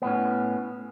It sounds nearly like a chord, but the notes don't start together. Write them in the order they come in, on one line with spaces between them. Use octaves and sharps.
B3 A2 C#4